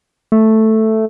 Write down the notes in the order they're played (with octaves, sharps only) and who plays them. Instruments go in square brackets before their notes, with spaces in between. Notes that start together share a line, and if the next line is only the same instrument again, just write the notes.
[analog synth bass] A3